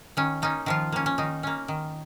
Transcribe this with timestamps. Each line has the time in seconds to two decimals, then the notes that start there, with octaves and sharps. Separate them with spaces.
0.17 D#3 C#4
0.42 A#3 C#4 D#4
0.66 D#3 F3 F4
0.92 A#3 C#4
1.06 C#4
1.18 D#3 D#4
1.43 A#3 C#4
1.68 D#3